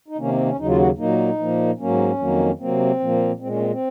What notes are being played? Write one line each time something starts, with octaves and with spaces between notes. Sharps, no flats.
D#4
C3 D#3 A#3 C#4
C4
C#4
D#2 C#3 F#3 D#4
F4
F#4
A#2 F#3 A#3 D#4
A#2 F3 A#3
G#2 F#3 A#3 C#4
F2 D#3 F#3 A#3
C3 F#3 A#3 C4
A#2 F3 A#3
A#2 G#3 C4
C#4
C4
C4